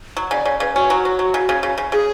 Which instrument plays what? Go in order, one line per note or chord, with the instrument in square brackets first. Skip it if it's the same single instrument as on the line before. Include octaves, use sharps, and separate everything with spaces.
[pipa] F#3
[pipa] C#3 [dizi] D5
[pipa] C#3 [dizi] C#5
[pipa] C#3 [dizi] B4
[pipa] C#4 [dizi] F#4
[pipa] F#3
F#3
F#3
C#3
C#3
C#3
C#3
[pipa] C#3 [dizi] G#4